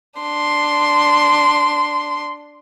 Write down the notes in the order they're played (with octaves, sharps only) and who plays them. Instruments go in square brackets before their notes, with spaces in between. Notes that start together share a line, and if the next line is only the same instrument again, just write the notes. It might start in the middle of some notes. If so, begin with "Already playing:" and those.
[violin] D4 C6